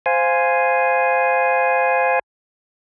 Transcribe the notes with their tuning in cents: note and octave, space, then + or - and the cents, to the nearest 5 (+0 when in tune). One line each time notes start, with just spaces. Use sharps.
C5 -5 F5 +0 G#5 +0